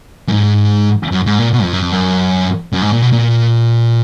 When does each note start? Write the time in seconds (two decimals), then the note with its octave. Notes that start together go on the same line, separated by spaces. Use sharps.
0.28 F#2
0.32 G#2
1.12 F#2
1.26 G#2
1.39 A#2
1.53 B2
1.63 F2
1.73 F#2
1.82 F2
1.92 F#2
2.73 F#2
2.82 G#2
2.93 A#2
3.02 B2
3.13 A#2